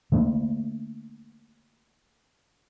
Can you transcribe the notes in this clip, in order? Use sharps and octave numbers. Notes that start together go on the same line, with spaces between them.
D3 A3 A#3